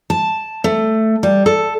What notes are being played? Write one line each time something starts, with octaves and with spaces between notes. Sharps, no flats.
A5
A3
G3
A4